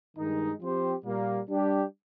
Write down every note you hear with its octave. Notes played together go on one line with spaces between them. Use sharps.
G2 D#3 G#3 D#4
F3 C4 G4 C5
A#2 G3 A#3
G3 D4 G4